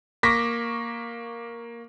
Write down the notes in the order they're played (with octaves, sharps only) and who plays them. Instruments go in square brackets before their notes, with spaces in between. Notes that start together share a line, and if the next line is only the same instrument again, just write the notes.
[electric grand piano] A#3 C#6 [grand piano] D6 A#6 B6